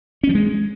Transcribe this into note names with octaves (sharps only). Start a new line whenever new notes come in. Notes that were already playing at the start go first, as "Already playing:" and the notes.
C#4
F3
G#3